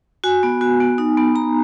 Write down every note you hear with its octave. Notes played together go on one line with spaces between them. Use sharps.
F#4 G#5
B3
F#4
B3
D#4
B3
B3 A#5